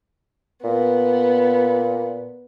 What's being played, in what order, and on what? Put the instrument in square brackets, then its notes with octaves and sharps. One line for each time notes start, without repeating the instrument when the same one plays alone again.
[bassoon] A#2 [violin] B3